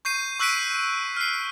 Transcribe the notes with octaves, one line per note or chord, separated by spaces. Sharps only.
C#6 G6 C7 D#7
C#6 E6 F#6 B6 D7 D#7
F6 C7